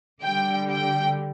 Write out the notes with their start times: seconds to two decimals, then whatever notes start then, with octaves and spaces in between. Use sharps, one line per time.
0.23 D3 G3 G5
0.71 G5